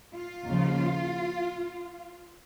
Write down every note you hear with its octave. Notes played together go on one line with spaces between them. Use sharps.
F4
D#2 C#3 F3